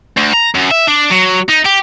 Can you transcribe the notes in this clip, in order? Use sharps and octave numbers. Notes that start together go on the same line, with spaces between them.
D2
A#5
F#2
E5
D4
F#3
D#4
G4